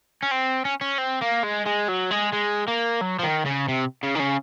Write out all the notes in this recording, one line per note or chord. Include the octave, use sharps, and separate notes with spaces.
C#4
C4
C#4
C#4
C4
A#3
G#3
G#3
F#3
G#3
G#3
A#3
F#3
F3
D#3
C#3
C3
C#3
D#3
C#3